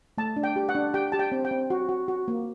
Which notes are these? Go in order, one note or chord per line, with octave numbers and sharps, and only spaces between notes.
A3 A5
D4
G5
G4
F#5
D4
G4 G5
G4 A5
G5
C4
G5
C4
F#4
F#4
F#4
A#3